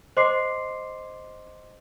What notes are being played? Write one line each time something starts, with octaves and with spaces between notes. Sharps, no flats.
C5 D#5 C6 D6 C7